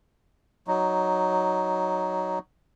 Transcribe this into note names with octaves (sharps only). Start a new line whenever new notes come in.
F#3 D#4